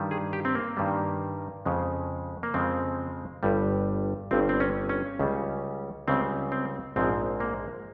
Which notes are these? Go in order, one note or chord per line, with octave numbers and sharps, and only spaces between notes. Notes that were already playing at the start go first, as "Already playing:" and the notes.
Already playing: G2 D#3 G3
G#4
G4
C4
A#3
G2 D#3 G3
F2 C#3 F3 G#3
A#3
F2 C#3 F3 G#3 C4
G1 G2 G3
G1 G2 G3 C4
C4
C#4
C#4
C#2 C#3 G3
C#2 C#3 G3 C4
C4
A#1 G#2 F3 G#3 C4
A#3